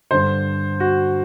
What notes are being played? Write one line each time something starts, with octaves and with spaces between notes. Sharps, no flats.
G2 D3 C5
F#4